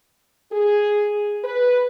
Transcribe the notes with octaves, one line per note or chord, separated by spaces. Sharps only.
G#4
B4